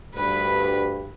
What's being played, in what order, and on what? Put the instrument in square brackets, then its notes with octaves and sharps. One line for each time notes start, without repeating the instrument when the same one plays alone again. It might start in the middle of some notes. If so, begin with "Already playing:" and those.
[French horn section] D2 G2 [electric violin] B4 B5